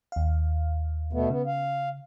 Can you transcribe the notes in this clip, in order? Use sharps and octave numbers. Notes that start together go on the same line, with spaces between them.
D#2 F5
B2 A3 B3
C#3 B3
F5